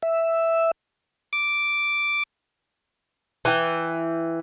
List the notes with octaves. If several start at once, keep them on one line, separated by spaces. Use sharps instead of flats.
E5
D6
E3 G5